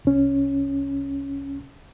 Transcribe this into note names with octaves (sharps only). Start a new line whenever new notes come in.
C2 C#4